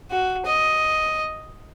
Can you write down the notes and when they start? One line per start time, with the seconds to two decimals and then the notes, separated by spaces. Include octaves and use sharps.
0.11 F#4
0.46 D#5